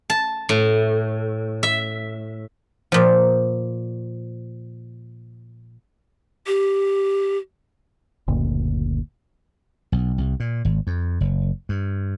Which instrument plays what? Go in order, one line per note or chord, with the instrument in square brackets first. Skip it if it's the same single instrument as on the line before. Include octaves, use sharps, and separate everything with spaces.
[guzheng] A5
A2
E5
A#2 F3
[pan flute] G4
[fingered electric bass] F#1 D2 A#2
[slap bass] B1
C2
A#2
G#1
F2
F#1
G2